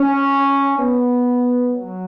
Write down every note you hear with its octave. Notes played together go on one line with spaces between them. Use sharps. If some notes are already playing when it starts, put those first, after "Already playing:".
Already playing: C#4
B3
F#3